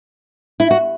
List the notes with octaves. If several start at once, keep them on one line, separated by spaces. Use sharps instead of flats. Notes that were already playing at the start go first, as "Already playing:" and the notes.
E4
F#4